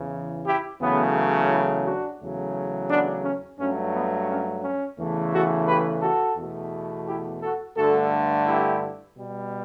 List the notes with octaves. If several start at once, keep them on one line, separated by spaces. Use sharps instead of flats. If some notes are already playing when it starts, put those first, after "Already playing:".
Already playing: E2 C#3 E3
E4 G4
E2 C#3 F#3 A3 B3
C#4 E4
D4 F#4
E2 C#3 F#3 A3
B3 D4
C#4
G2 F#3 A3 C#4
B3
C#4
C#4
E2 C#3 E3 A3
F#4 A4
G4 B4
F#4 A4
E2 B2 A3
E4 G4
F#4 A4
G2 D3 A3 F#4 A4
E4 G4
B2 G3